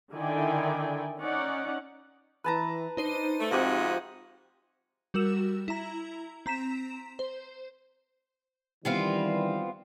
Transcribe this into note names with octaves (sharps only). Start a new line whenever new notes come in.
D3 D#3 E4 D5 G5 G#5
C#4 D#4 D5 F#5
E3 B4 A5 A#5
D4 D#4 C5 D#7
A3
G#2 C3 F3 C4 F#4 G4
G3 F#4 A#4 E6 E7
E4 A#5
C4 A#5 B6 E7
C5
D#3 E3 G3 B3 C4 F4